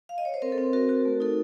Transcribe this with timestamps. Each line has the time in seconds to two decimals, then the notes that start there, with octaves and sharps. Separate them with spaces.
0.09 F5
0.18 D#5
0.25 C#5
0.34 C5
0.42 C4 A#4
0.52 A4
0.58 C4
0.73 F#4 A#4
0.89 F#4
1.05 A3
1.20 D#4 A4